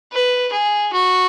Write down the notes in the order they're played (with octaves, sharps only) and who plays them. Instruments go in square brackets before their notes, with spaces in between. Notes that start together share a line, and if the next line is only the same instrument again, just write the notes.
[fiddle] B4
G#4
F#4